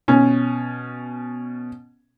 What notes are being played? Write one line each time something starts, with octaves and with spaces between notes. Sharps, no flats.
B2 C#4